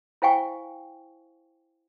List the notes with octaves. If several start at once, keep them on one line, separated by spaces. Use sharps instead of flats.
E4 C5 F5 G5 G#5 C#6